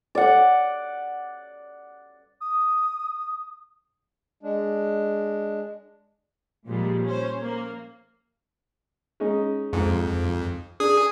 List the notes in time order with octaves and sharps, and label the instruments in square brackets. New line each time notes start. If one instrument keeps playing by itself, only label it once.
[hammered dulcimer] D5 F#5
[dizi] D#6
[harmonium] G#3 D4
[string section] A#2 F3 G3 G#3
C#4 C5
A#3
[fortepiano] G#3 C#4 D#4
[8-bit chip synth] F2 [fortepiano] G#2
[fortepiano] D4 [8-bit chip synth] G#4 D#6